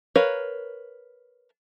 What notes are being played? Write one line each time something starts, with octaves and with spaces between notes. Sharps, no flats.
A#4 B4 C#5 F5